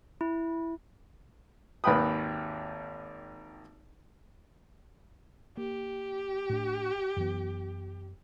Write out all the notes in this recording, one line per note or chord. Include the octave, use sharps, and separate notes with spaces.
E4
G#1 D#2 B4 G5 B5 D#6
A#3 G4
A2 D4
F#2 E3 B3